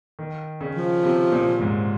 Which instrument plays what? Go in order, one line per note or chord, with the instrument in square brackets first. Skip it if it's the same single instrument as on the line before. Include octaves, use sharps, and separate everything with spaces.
[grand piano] D#3
C#3
[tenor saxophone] F3
[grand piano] C3
A#2
G#2